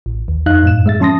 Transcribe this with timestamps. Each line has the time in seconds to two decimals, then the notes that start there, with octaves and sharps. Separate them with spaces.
0.06 A1
0.28 D#2
0.46 F2 D#4 D#5 F5 F#6
0.63 F#2 A2 E7
0.86 G#3 E5 A6
1.00 F3 C#4 A5 C6 D#6 A#6